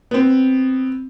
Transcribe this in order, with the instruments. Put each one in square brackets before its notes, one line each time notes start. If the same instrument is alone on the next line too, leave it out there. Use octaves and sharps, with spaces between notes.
[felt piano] B3 C4